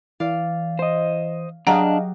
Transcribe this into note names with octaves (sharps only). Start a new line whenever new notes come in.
E3 D5 F5
C5 D#5
F#3 D4 G4 G#4 D#5 F5 F#5 A#5